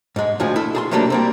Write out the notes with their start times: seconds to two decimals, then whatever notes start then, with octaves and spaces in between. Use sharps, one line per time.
0.16 G#2 G#3
0.40 D2 A2 F3 G#4
0.56 E4 A4
0.75 G#4 A5 C6
0.91 C3 F#3 G3 A3 A#3 D4
1.10 G3 A#3 C4